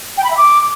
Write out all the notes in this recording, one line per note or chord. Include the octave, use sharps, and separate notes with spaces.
G5
B5
E5
D6